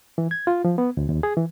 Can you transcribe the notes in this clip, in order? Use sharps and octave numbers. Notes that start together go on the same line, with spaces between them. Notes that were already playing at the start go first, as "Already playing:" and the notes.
E3
G#6
F4
F3
B3
D2
D#2
G#4
E3